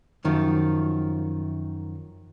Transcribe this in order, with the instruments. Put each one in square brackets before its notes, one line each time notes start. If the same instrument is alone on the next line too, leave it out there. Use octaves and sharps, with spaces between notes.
[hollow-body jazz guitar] F#2 D#3 F3